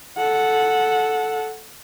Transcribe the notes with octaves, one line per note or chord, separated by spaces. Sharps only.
A4 F#5